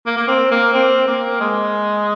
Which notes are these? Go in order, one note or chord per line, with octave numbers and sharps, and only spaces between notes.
A#3
A#3
C4
A#3
C4
A#3
G#3